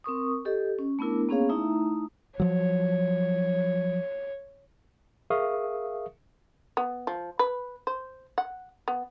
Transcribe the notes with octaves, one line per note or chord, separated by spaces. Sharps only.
C4 A#4 C#6 D#6
G4 A4 D#5
C#4
A3 B3 D4 E4 A#4
A#3 B3 C#4 G#4 C#5 F5
A3 D#4 E4 E5 A#5
F3 F#3 C#5
G#4 A#4 E5 F5 C#6 D#6
B3
F3
B4
C5
F#5
B3